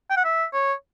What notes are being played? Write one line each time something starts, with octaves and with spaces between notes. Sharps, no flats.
G5
F#5
E5
C#5